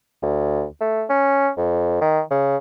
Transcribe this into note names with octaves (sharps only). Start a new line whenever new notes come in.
D2
A3
C#4
F2
D#3
C#3